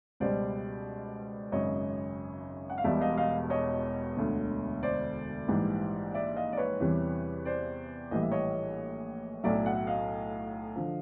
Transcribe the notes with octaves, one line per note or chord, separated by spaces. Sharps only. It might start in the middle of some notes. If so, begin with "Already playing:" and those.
C#2 B2 G3 C5 D5
G#1 F#2 C#3 C#5 D#5
F#5
F5
E1 E2 B2 G3 D5 E5
D#5 F5
D#5 F5
C#5 D#5
E1 D2 D3
C5 D5
A#1 G#2 E3 G3
D5 E5
D#5 F5
D5
B4 C#5
E2 C3 E3 G3
C5 D5
A#1 A2 E3 G3 D#5
E5
C#5 D#5
B1 A2 F#3 D5 E5
E5 F#5
D#5 F5
D3 F3